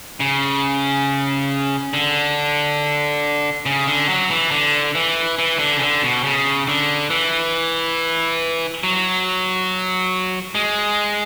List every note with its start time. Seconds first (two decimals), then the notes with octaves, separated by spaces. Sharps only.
0.20 C#3
1.94 D3
3.66 C#3
3.87 D3
4.09 F#3
4.31 E3
4.51 D3
4.95 E3
5.39 E3
5.59 D3
5.77 C#3
5.81 D3
6.03 B2
6.24 C#3
6.68 D3
7.10 E3
8.83 F#3
10.55 G#3